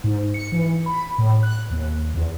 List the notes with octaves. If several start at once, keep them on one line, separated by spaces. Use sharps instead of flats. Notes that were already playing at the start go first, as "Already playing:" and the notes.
G#2
C#7
E3
B5
A2
F#6
D#2
E2